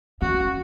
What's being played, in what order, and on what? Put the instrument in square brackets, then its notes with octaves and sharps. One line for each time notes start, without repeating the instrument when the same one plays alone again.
[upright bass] C#4 [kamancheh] F#4